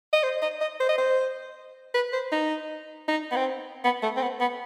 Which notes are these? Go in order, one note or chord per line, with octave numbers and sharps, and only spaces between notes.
D#5
C5
D#5
D#5
C5
D#5
C5
B4
C5
D#4
D#4
B3
C4
B3
A3
C4
B3
B3